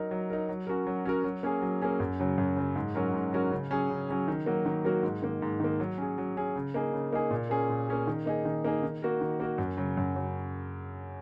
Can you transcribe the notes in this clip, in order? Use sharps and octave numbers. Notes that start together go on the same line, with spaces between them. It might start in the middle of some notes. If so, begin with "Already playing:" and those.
Already playing: F#3 D#4 A#4
F#3
D#4 A#4
F#3
C#4 F#4 A#4
F#3
C#4 F#4 A#4
F#3
A#3 C#4 G#4
F#3
A#3 C#4 G#4
F#2
C#3 F#3
F#2
C#3 F#3
G#2
F#3 C#4 F#4 A#4
G#2
F#3 C#4 F#4 A#4
C#3
F#3 C#4 G#4
C#3
F#3 C#4 G#4
D#3
F#3 A#3 F#4 A#4
D#3
F#3 A#3 F#4 A#4
G#2
D#3 A#3
G#2
D#3 A#3
F#3
C#4 G#4
F#3
C#4 G#4
C#3
A#3 D#4 G#4
C#3
A#3 D#4 G#4
A#2
A#3 C#4 G#4
A#2
A#3 C#4 G#4
D#3
A#3 D#4 G#4
D#3
A#3 D#4 G#4
D#3
A#3 F#4 A#4
D#3
A#3 F#4 A#4
F#2
C#3 F#3
F#2
C#3 F#3